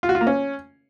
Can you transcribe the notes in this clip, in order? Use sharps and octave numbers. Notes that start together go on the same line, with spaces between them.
F4
F#4
F4
A#3
C#4